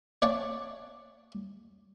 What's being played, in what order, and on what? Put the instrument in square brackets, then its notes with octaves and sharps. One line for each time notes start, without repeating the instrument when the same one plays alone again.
[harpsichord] C#5 D5 F#5 A5